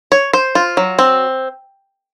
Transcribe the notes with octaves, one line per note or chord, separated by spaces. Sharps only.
C#5
C5
F4
F#3
C4